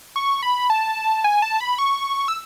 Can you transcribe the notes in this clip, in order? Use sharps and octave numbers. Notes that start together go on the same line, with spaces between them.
C#6
B5
A5
G#5
A5
B5
C#6
E6